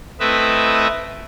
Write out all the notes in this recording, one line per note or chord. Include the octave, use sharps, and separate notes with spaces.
A3 C4 E4 B4 D#5 E5